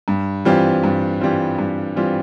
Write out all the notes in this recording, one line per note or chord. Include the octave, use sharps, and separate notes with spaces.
G2
E3 G3 C4 F4
G2
E3 G3 C4 F4
G2
E3 G3 C4 F4